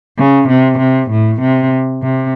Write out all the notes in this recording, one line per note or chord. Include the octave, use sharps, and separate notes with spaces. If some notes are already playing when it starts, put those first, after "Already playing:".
C#3
C3
C3
A2
C3
C3